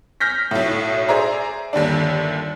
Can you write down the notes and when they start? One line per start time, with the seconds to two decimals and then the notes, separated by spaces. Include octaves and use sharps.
0.20 F6 G6 A#6 B6
0.51 B1 A2
1.08 G#4 C5 D5 E5 A#5
1.73 G1 D#2 G3 D4